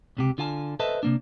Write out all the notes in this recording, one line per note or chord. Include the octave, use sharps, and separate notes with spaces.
C#2 C3 G4
D3 F4 F5 G#5 A5
A4 B4 C5 D#5 E5 A5
C3 A#3 D4